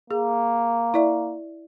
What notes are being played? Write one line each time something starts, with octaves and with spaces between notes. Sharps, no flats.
A#3 G#4
E4 D5 E5